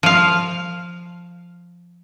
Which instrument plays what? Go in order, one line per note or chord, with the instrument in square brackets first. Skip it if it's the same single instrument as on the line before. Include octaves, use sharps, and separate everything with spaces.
[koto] F3 F5